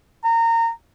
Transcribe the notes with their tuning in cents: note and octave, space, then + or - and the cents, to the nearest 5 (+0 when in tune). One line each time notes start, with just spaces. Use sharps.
A#5 -25